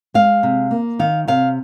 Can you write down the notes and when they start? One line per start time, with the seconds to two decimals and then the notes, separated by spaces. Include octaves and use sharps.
0.14 G#3 F5
0.43 C3
0.71 A#3
0.99 D#3 F5
1.28 C3 F5